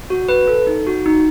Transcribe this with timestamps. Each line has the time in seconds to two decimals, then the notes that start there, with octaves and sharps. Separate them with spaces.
0.10 F#4
0.28 B4
0.47 A4
0.67 D#4
0.87 F#4
1.06 D#4